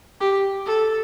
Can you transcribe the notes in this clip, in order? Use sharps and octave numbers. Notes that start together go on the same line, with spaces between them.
G4
A4